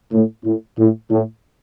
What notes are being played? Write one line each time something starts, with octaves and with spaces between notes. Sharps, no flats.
A2
A2
A2
A2